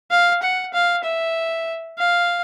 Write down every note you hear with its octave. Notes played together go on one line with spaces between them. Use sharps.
F5
F#5
F5
E5
F5